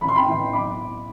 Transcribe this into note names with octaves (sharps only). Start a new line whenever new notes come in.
A1 B5
C6
G5 B5
A2 E3
B1 B5 D6